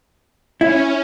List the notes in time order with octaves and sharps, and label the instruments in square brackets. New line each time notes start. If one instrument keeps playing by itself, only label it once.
[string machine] C#4 [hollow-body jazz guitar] E4